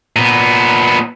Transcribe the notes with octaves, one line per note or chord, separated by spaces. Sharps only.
A#2 B3